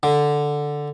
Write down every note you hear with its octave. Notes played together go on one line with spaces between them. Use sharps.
D3